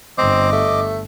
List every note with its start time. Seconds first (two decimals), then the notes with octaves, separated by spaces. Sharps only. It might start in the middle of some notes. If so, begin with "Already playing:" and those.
0.18 G1 C4 D#5 D6
0.52 A3